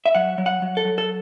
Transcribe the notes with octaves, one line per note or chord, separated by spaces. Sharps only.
E5
F#3 F#5
F#3
F#5
F#3
A4
F#3
A4